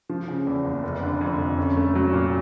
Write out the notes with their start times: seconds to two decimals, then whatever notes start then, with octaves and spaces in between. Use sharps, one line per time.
0.10 F3
0.28 C#3
0.47 E2
0.65 F#1
0.83 F1
1.02 D3
1.21 F2
1.39 F1
1.58 C#4
1.76 A3
1.95 F#3
2.13 A#2